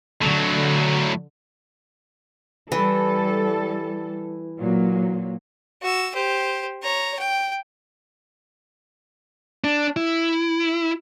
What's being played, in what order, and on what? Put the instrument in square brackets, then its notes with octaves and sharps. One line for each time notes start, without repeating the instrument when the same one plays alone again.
[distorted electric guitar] A2 F#3 [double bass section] D3
[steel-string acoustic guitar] E3 [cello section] G3 A4
[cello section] A#2 F#3 A#3
[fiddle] F#4 E6
G4 C5
C#5 A#5
G5
[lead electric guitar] D4
E4